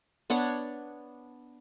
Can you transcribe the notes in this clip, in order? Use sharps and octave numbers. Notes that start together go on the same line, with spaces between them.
B3 D4 C#5 F#5